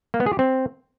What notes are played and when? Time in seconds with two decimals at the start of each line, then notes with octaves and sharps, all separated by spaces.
0.14 A#3
0.20 B3
0.26 G#4
0.33 G4
0.39 C4